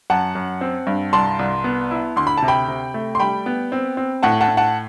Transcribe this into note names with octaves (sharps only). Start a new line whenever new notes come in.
F#2 F#5 A5
F#2
C4
G2
C2 A5 C6
C2
B3
E4
D2 C6
B5
A5
C3
G5 B5
C3
A3
C6
G3 G5 B5
B3
C4
C4
A2 F#5 A5
F#5 A5
A2
F#5 A5